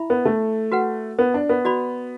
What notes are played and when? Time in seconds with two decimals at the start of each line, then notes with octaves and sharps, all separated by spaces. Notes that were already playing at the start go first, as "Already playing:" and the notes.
Already playing: E4 E5 B5
0.10 B3
0.25 A3
0.72 F#4 B4 F#5
1.19 B3
1.34 D4
1.49 B3
1.65 F#4 D5 B5